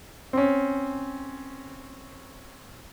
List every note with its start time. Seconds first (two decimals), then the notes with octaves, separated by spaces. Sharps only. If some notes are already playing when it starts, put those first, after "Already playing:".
0.33 C4 C#4